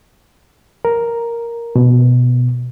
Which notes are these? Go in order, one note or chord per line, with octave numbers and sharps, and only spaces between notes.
A#4
B2